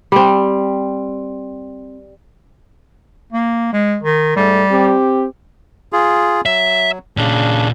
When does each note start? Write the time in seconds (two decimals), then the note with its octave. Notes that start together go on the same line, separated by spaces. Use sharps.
0.12 G3 C4
3.33 A#3
3.73 G#3
4.03 D#3
4.36 G#2 G3 A3 A4
4.71 C4 G4
5.93 F4 G#4
6.46 F#3 E5
7.17 A#2 C#3 C#4 D4